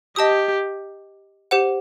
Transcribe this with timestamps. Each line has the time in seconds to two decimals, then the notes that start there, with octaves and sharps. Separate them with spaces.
0.16 G4 D#5 A5 D#6
1.51 G4 C5 F#5